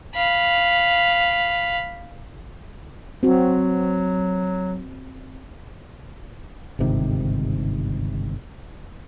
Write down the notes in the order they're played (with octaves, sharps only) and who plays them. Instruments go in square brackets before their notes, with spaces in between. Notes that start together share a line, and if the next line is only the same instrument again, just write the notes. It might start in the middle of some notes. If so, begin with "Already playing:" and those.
[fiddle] F5 B5
[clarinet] F#3 [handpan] C4 F#4
[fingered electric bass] G1 G#2 C3 D#3